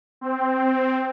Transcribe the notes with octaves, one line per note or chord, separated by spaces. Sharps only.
C4